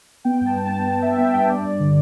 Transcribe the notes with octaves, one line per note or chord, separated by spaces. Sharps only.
B3 G5
G2
A5
G2
B3 A5
B3 G5
B3 E5
B3 G5
G2 G5
G2 D5
G2
D3